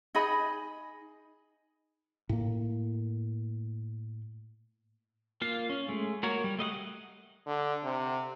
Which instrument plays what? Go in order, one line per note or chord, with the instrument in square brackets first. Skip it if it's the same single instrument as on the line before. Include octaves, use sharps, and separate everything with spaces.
[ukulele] D#4 G#4 D#5 B5
[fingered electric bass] A2 A#3
[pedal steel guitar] A#3 F4 F5
C#4
G#3 A3
A#3 F#4 A#4 C#5
G3
A3 D#5 F5 F#5
[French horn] D3
C3